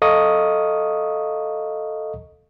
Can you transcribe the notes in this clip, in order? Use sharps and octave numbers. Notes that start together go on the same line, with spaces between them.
A4 D#5 F5 A#5 C#6 D#6